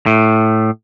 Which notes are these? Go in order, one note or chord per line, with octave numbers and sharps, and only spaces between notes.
A2